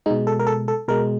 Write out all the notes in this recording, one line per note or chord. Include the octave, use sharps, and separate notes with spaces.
B2 G#3 D#4
A4
A#4
A4
A4
B2 G#3 A#4